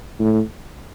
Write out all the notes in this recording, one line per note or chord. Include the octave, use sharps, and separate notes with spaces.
A2